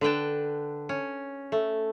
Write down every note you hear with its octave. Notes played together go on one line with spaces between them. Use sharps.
D3 B4 G5 A5
C#4
A3